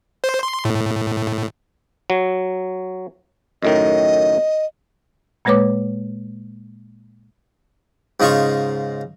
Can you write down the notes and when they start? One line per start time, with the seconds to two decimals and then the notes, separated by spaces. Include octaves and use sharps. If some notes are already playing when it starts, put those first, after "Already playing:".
0.24 C5
0.43 C6
0.65 A2
2.10 F#3
3.62 F#2 A2 D#3 D#5
5.45 A#2 G#3 A#3 B4 C#5 D6
8.20 G#2 C#3 D#4 F4 A#5 C#6